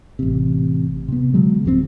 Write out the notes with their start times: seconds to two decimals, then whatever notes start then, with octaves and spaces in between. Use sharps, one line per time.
0.19 A1 C3
1.08 C3 B3
1.34 D3 F#3 G#3
1.64 D1 F2 F3 C4